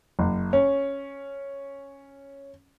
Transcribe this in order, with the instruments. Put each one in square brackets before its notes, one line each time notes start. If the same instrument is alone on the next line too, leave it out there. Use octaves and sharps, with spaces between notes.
[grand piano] F#1
C#4